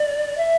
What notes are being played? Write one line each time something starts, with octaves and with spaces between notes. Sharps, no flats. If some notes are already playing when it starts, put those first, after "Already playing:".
Already playing: D5
E5